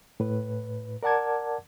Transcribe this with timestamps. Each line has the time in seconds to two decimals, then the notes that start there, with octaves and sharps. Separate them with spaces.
0.20 A2 B4
1.03 A#4 D5 F#5 A5 D6 G#6